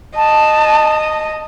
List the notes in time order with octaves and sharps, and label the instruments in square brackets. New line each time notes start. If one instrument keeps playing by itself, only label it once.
[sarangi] D#5 [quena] A5